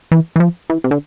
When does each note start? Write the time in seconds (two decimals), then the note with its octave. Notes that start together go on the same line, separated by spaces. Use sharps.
0.12 E3
0.36 E3
0.40 F3
0.70 E3
0.84 C3
0.91 D3